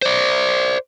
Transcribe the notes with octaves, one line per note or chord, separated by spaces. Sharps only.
C5 D5